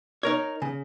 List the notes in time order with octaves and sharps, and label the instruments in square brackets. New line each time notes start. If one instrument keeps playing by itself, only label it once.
[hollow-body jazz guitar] D#4 A#4 C#5
C#3